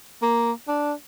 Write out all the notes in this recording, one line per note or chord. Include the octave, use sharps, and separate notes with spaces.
A#3
D4